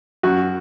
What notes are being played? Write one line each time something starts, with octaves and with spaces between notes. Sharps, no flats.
F#2 F#4